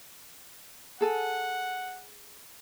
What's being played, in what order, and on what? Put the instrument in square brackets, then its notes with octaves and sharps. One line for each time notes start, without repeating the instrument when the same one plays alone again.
[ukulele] G#4 A4 G#5 [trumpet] F#5